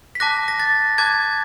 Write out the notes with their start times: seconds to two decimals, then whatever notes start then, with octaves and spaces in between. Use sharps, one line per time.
0.15 B6
0.20 A5 D6 F#6 A#6
0.48 A#6
0.60 A6
0.98 A5 D6 F#6 G#6